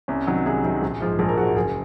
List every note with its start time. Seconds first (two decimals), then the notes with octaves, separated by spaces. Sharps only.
0.08 C2 C#4
0.27 C3 D#3 F#3
0.45 C2 G#4
0.64 C3 D#3 F#3
0.82 A#1
1.01 G#2 F3 G#3
1.19 A#1 G#4
1.29 A#4
1.37 G#2 F3 G#3 F#4
1.56 F#1 G#4